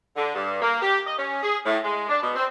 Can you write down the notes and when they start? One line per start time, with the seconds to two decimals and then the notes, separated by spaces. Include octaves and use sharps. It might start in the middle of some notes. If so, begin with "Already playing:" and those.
0.16 D3
0.35 G2
0.62 A#3
0.82 G4
1.06 D#5
1.18 C#4
1.43 G#4
1.66 A2
1.84 G#3
2.09 D4
2.21 B2
2.35 C4